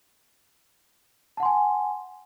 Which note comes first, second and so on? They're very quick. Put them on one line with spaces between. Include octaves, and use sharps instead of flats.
A5 F#5 C6 G#5